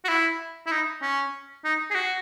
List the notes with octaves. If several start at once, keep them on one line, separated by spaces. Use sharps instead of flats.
F#4
E4
E4
D#4
C#4
D#4
G#4
F#4